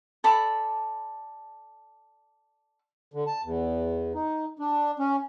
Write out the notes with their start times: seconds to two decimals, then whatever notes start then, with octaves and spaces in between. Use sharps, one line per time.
0.24 A4 D5 B5
3.14 D3
3.27 A5
3.44 E2
4.14 D#4
4.59 D4
4.99 C#4